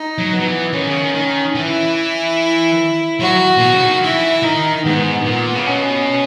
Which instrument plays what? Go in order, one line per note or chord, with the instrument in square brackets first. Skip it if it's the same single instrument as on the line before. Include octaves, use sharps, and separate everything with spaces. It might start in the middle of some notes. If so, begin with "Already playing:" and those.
Already playing: [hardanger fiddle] D#4
[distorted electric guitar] F#3
[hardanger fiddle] B3
[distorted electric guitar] F#3
E3
[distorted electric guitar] D#3 [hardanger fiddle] C#4
[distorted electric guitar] C#3
D#3
D#3
[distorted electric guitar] E3 [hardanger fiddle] E4
[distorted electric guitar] F#3 [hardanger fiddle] F#4
[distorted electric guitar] A#2
B2
C#3
D#3
[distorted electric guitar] E3 [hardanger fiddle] E4
[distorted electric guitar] D#3 [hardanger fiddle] D#4
[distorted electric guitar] G#2 [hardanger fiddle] B3
[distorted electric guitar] A#2
C#3
[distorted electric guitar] B2 [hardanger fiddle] C#4